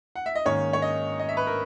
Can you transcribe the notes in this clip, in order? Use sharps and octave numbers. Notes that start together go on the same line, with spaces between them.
F#5
E5
D#5
G#2 D#3 A#3 C#4 C#5
C#5
D#5
D#5
E5
B4
A#4